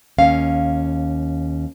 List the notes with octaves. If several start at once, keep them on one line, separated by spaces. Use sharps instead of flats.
D#2 C#4 F5